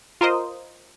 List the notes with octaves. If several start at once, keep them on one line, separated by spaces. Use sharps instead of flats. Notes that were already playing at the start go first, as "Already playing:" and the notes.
F4 A#4 C5 D#5